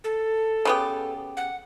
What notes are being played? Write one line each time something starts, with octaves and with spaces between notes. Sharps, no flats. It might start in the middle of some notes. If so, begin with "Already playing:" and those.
A4
C#3 B3 G4
F#5